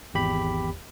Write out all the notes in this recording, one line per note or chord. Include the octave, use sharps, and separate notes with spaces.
G#1 E2 G4 B5